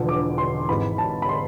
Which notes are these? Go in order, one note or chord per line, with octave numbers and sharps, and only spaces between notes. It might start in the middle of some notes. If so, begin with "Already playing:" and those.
Already playing: E1 E2 D3 F3
D6
C6
G#1 G#2 E3 B5
A5
B5
C6